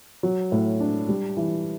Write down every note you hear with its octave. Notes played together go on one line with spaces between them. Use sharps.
F#3
A2
D4
G3
E3